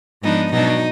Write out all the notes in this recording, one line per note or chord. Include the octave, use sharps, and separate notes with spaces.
G#2 F3 B3 D4 D#4
B2 F#3 D4 D#4